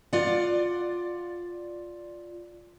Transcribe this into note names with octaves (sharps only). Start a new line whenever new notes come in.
F4 D5 F#5